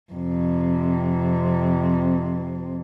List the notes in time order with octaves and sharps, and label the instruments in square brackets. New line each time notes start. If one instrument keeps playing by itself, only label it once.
[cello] F2 C3